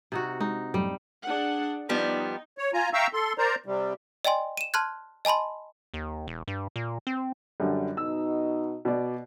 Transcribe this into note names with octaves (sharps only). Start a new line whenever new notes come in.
C3 D#4 F#4
G#3 D#4
F#2 A2 C3 G3
D4 G#4 F#5
F3 G3 B3 D#4
C#5
F4 G#5 A#5
E5 F5 G5 A#5 C#6 E6
A4 C6
A#4 C5 D5 A#5
C3 G3
D5 D#5 G5 G#5 C6
D#7 E7
A5 C6 F6 F#6 G#6
D#5 G#5 A5 B5 C6
D#2
E1
G2
A#2
C4
F#2 D3 G3
B2 D#4 E6
B2 D5